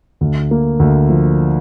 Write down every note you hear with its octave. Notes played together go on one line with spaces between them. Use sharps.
D2
A#3
D2
F3